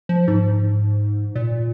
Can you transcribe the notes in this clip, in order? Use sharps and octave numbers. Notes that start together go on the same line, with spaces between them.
F3
G#2
A#2